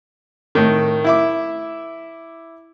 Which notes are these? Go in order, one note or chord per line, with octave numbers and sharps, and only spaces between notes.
A2 D#3
E4 E5 D6